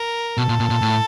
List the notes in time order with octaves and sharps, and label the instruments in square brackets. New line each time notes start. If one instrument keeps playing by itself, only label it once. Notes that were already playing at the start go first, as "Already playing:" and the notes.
Already playing: [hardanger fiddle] A#4
[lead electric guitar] B2 [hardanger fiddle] A4
[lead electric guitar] A#2
A#2
A#2
A2